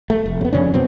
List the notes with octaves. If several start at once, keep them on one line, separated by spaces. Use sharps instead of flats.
A3
F1
C#3 B3
F2 C#3 C#4 D4
B2 F#3 B3 C4